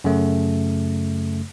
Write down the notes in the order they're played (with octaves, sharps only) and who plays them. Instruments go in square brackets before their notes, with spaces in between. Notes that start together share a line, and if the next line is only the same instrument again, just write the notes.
[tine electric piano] F#2 C#3 A3